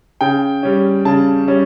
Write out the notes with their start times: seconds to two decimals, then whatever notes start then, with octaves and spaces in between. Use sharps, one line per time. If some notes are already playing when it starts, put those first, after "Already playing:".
0.21 C#3 G5
0.63 G3 C#4
1.05 C#3 A5
1.47 G3 C#4